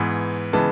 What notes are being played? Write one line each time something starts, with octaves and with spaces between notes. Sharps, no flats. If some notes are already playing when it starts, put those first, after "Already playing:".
Already playing: G#2 E3 B3
C#3 E3 G#3 B3 A5